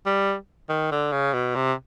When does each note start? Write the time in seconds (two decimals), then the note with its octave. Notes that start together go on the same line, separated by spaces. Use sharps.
0.06 G3
0.69 D#3
0.92 D3
1.12 C#3
1.34 B2
1.55 C3